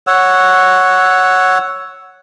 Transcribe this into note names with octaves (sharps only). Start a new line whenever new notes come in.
C#5 F#5 E6